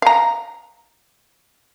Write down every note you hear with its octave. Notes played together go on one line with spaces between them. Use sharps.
F5 A#5